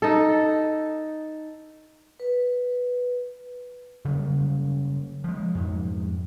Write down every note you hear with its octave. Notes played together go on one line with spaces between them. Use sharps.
D#4 A4
B4
C#3 F#3 G3 A#3
F3 G#3
F2 G#2